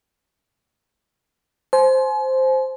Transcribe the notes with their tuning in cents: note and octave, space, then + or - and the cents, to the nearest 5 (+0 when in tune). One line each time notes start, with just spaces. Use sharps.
C5 +0 G#5 +40